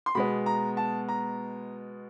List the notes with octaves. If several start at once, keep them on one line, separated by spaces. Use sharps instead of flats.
C6
B2 G#3 B3 B5
A#5
A5
A#5